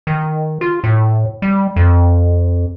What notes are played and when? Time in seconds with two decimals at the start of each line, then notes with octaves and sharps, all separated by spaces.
0.07 D#3
0.61 F4
0.84 A2
1.42 G3
1.76 F2